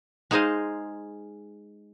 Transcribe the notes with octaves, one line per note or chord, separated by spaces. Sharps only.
G#3 D#4 G#4 C5 D#5 F5